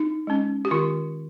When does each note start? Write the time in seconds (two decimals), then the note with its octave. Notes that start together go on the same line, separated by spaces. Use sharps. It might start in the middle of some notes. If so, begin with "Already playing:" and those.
Already playing: D#4
0.27 G#3 C#4
0.65 G4
0.71 D#3 F4